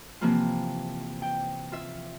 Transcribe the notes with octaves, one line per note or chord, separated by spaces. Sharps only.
C3 E3 F3 A#3 C4 F4
G5
F4 E5